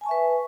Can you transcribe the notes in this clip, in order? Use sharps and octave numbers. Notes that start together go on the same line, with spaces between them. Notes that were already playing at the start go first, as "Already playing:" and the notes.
B4 E5 G#5 A5 C#6